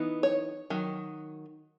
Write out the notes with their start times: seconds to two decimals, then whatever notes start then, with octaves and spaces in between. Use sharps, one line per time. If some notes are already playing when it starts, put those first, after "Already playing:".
Already playing: E3 B3 D#4
0.23 C#5
0.70 D#3 F#3